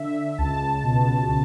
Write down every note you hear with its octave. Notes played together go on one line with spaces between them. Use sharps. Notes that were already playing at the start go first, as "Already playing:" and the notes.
Already playing: D3 E5
C#2 A5
B2
C#3